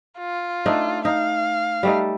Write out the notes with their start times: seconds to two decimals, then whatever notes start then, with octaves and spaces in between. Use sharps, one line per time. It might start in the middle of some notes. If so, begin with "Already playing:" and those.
0.18 F4
0.66 A3 D4 D#4
1.05 D#4 F5
1.83 G3 A3 D#4